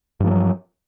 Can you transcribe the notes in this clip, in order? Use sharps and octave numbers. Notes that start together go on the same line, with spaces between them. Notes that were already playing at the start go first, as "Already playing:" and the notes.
G2 F3 F#3 A3